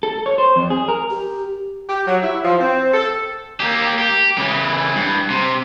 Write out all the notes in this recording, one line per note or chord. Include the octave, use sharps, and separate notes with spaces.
A4
C#5
C5
F2
G#4
A#4
G4
G4
F#3
E4
F3
C4
A4
A#3 G4
G4
C#3 E3
G2
C3